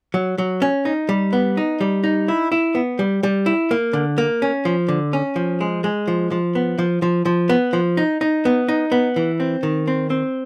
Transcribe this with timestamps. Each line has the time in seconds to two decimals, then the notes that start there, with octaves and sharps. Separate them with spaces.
0.14 F#3
0.38 F#3
0.62 C#4
0.85 D#4
1.09 G3
1.33 B3
1.57 D#4
1.81 G3
2.04 D#4
2.28 E4
2.52 E4
2.75 B3
2.99 G3
3.23 G3
3.46 E4
3.71 A#3
3.93 D3
4.18 A#3
4.42 C#4
4.65 F3
4.88 D3
5.13 C#4
5.36 F3
5.61 G#3
5.84 G#3
6.08 F3
6.31 F3
6.55 B3
6.79 F3
7.02 F3
7.25 F3
7.49 B3
7.73 F3
7.97 D#4
8.21 D#4
8.45 B3
8.68 D#4
8.92 B3
9.16 E3
9.40 C4
9.63 D#3
9.87 C4
10.10 C4